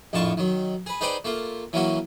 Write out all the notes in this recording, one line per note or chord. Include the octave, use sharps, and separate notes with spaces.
A#1 F2 A2 F4 A5 C#6
D#3 F#3
G#4 B4
D#4 G#4 B4 C5 D5 G5
A3 A#3 F4
E3 F#3 A#3 C#4 F#4